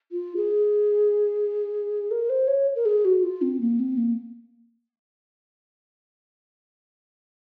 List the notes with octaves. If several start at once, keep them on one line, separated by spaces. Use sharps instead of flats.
F4
G#4
A#4
C5
C#5
A#4
G#4
F#4
F4
C4
A#3
C4
A#3